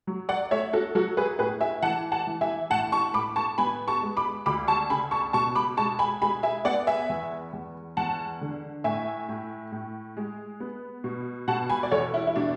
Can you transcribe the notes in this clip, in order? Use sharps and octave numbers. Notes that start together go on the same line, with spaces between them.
F#3
D5 F#5
A3 C#5 E5
F#4 A4
F#3 F#4 A4
G#4 B4
A2 G#4 B4
E5 G#5
E3 F#5 A5
F#5 A5
E3
E5 G#5
A2 F#5 A5
A5 C#6
A2 B5 D6
A5 C#6
B3 G#5 B5
A5 C#6
G#3
B5 D6
D2 B5 D6
A5 C#6
C#3 G#5 B5
A5 C#6
B2 A5 C#6
B5 D6
G#3 A5 C#6
G#5 B5
G#3 G#5 B5
E5 G#5
B3 D5 F#5
E5 G#5
E2
E2
E2 F#5 A5
D3
A2 E5 G#5
A2
A2
G#3
B3
B2
B2 F#5 A5
G#5 B5
D5
E2 A4 C#5
E4
E4
B2 D4